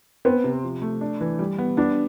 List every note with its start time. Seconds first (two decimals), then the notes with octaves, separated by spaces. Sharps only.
0.25 B3 C4
0.44 C3
0.64 F3
0.82 A3
1.01 D4
1.21 E3
1.39 G3
1.58 B3
1.77 B3 D4